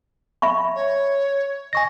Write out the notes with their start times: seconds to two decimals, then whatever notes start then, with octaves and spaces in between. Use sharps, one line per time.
0.42 E5 B5 C#6
0.76 C#5
1.73 D#5 G#5 C#6 A#6